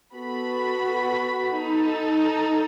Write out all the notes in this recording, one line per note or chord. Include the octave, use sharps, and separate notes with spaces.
B3 F#4 A4 B5
D#4 A4